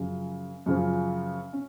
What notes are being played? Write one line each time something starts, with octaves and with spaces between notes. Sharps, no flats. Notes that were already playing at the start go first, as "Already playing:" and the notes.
Already playing: F#2 C#3 F3
F#2 C#3 F3
C#4